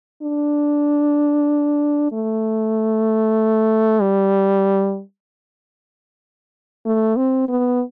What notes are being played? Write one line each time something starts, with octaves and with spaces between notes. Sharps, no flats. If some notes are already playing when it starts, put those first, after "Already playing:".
D4
A3
G3
A3
C4
B3